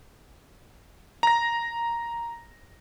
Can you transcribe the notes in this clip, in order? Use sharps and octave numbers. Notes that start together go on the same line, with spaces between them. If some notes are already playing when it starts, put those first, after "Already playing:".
A#5 A#6